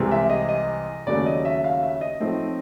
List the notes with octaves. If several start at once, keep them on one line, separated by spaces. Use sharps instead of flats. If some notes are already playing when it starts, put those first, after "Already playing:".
Already playing: C2 C3 E3 G#3 C4
E5
D#5
D#5
D#2 C#3 F#3 A3 C#4 D5
D#5
E5
F5
E5
D#5
A2 F3 A3 C4 D#4